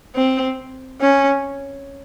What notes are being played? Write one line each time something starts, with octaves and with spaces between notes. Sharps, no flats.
C4
C#4